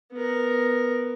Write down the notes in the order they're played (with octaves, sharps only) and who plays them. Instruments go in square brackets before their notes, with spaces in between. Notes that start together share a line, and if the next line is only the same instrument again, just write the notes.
[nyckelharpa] B3 A#4